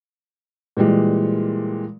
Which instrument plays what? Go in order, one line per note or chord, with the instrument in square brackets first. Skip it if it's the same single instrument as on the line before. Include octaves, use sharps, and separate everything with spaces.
[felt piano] A#2 E3 G3 G#3